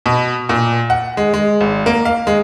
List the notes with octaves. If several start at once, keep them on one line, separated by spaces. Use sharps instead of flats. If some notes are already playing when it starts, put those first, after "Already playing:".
B2
A#2
F#5
G#3
G#3
G#1
A#3
F5
G#3